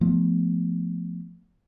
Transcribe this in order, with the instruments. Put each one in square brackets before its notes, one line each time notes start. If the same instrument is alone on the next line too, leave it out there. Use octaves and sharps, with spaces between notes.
[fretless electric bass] F3 A3 B3